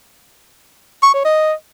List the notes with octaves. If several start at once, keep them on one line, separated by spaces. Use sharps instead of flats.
C#6
C#5
D#5